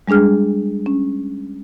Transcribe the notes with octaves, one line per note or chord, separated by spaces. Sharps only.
G3 G#3 D4 G#4 F6
C#4